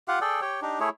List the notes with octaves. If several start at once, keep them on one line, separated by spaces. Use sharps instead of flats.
F4 G4 F5 F#5
G#4 A4 D5 G5
G4 C#5 G5
D4 D#4 G4
A3 E4 G#4 C#5